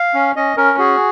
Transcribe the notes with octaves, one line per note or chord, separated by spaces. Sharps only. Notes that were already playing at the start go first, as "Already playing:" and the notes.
Already playing: F5
C#4
C#4 D#5
C#4 A#4
F#4 G#4